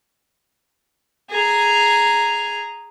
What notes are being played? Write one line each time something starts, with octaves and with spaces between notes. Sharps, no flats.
G#4 A#5